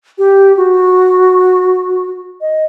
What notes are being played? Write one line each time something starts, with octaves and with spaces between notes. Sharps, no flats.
G4
F#4
D#5